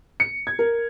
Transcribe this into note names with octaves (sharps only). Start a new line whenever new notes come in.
C#7
G#6
A#4